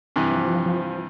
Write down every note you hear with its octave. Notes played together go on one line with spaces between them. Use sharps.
G2 C3 E3
F3
F3